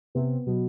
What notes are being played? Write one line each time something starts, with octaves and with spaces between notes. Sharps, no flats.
C3 B3
B2 F#3